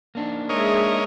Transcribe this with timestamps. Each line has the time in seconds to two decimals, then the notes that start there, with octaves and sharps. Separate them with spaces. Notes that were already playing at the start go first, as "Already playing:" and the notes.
0.15 A#3 D4 D#4
0.49 G#3 G#4 A#4 C#5 D#5 E5